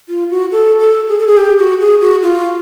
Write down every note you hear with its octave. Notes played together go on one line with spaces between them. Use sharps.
F4
F#4
A4
A4
G#4
A4
G#4
G4
F#4
G#4
F#4
F4